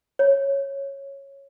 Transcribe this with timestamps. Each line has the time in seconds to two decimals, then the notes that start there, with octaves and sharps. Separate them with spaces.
0.19 C#5